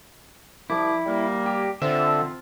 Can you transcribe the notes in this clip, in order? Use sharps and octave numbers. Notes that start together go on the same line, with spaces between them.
C2 F3 E4 D6
G3 A#3
G4
D3 C4 F4 E5